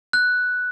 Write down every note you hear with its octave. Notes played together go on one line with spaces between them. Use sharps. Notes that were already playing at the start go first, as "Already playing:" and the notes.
F#6